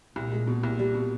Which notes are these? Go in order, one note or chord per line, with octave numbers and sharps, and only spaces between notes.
C2 A#2
G#3
B2
C2
G3
B2